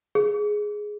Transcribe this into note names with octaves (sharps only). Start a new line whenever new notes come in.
G#4